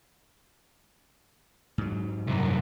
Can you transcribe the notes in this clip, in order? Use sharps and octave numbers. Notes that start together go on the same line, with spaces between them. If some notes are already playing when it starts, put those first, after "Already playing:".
G#2 F#3
C2 F#2